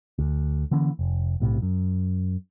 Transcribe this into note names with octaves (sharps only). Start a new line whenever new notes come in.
D2
D3 E3 A#3 C#4
F1
B1 A2 C3
F#2